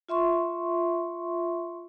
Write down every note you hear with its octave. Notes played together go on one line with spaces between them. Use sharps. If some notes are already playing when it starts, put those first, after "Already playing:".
F4 E5 C6 C#6